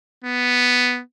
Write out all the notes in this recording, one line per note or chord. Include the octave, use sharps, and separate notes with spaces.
B3